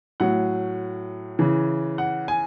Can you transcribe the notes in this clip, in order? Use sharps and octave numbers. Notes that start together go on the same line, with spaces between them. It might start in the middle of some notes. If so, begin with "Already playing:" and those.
A2 F#3 F#5
C#3 E3
F#5
G#5